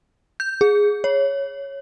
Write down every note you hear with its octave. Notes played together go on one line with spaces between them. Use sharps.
G6
G#4
C#5